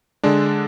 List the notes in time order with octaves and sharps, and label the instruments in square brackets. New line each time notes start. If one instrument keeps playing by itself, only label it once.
[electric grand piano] D3 G#3 D4